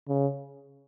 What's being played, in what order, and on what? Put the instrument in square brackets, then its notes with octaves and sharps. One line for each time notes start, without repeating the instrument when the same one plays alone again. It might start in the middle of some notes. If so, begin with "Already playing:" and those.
[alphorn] C#3